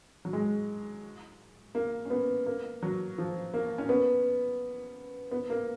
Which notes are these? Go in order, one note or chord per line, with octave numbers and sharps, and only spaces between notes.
F#3
G#3
A#3
C#4
B3
A#3
F#3
F3
A#3
C#4
B3
B3
A#3